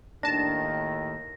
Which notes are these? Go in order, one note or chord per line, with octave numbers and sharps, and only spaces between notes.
D#2 A2 D#3 D4 A5 A#6